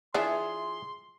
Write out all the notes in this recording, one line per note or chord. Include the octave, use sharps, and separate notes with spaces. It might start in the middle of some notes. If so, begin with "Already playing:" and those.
E3 D4 F4 G#4 C#5 E5 C6